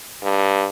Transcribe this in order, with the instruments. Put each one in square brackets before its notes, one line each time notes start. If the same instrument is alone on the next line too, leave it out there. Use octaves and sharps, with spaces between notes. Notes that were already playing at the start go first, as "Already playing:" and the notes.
[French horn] G2